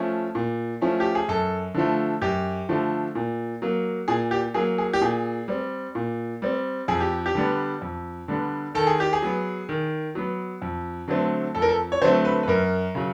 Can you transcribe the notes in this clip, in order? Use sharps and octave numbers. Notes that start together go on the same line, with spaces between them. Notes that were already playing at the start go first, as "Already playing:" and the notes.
Already playing: F3 A3 C#4
A#2
F3 A3 C#4
G4
G#4
F#2 A4
D3 F3 A3
F#2 G4
D3 F3 A3
A#2
F#3 A#3
A#2 G#4
G4
F#3 A#3 G#4
G#4
G4
A#2 G#4
G3 C4
A#2
G3 C4
F2 G#4
G4
G4
D3 G3 B3
F2
D3 G3 B3
D#3 A4
G#4
G4
G#4
F#3 B3
D#3
F#3 B3
F2
D3 F#3 A3 C4
F2 A4
A#4
A4
C#5
D3 F#3 A3 C4 C5
B4
B4
F#2 A#4
C#3 F#3